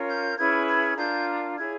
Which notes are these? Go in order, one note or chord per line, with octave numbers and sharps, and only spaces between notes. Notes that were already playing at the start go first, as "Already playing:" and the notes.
Already playing: C#4 F4 A#4 C#5
G6
C#4 E4 G#4 B4 G#6
G#6
D4 F4 A#4 G6
E4 G#4 C#5 G#6